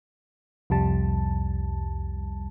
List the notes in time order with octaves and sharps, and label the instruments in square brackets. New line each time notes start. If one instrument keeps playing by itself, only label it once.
[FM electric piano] C2 F2 G3 A5